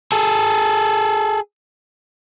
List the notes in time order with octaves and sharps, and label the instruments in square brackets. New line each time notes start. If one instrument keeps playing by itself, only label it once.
[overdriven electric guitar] G#4 A4